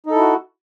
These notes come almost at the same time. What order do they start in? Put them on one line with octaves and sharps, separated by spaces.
D#4 A4 E4 F#4